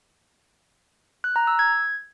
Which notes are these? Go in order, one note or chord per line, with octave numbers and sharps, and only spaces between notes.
F#6
A#5
E6
G#6